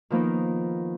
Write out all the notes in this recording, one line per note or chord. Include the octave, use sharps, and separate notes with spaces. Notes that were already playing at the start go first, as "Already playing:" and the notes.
D#3 F3 A#3 B3 D#4